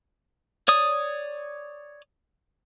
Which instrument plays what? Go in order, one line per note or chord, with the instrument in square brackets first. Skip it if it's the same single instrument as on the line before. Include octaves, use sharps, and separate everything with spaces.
[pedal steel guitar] C#5 D5 D#6